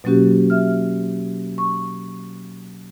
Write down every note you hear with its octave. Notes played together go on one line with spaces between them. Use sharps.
B2 F#3 A#3 C#4 F#4 G4
E5 F6
C#6